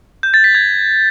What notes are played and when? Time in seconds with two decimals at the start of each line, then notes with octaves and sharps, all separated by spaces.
0.23 G6
0.34 A6
0.44 B6
0.55 G#6